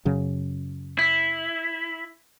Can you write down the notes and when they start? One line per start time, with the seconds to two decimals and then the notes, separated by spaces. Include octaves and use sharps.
0.05 F#2 C#3 F#3
0.99 E4